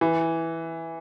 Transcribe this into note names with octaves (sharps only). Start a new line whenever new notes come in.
E3